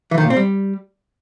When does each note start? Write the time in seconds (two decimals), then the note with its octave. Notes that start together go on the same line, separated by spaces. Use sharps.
0.11 E3
0.18 D#3
0.24 A#2
0.30 C4
0.37 G3